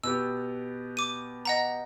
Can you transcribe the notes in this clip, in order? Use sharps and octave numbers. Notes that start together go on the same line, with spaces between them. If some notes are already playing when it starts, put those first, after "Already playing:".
B2 B3 G4 E6
D6 D#7
D#5 F#5 A#5